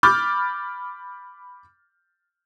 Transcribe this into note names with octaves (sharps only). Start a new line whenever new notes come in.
B5 D6 F6 G6 A6